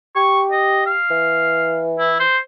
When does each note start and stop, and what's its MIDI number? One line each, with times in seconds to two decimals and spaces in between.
0.16 0.96 67
0.16 0.41 85
0.52 0.82 75
0.86 1.84 77
1.10 2.23 52
1.99 2.15 64
2.20 2.38 72